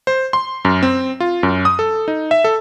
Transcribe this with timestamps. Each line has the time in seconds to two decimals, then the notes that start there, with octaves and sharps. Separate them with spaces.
0.07 C5
0.33 C6
0.65 F#2
0.83 C4
1.20 F4
1.43 F#2
1.65 D#6
1.79 A4
2.08 D#4
2.31 E5
2.44 A4